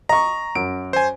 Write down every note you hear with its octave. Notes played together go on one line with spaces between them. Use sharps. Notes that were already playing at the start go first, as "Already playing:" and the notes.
D#5 A#5 C#6
F#2 D7
C5 G#5